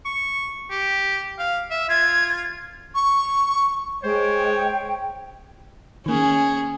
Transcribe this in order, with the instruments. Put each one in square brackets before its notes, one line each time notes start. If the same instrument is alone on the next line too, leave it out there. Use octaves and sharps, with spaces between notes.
[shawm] C#6
G4
F5
E5
[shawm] F4 [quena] G#6
[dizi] C#6
[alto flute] G#3 [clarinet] C5 [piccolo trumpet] C#5 [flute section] G5
[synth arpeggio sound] D#3 A#3 [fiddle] C#4 G#4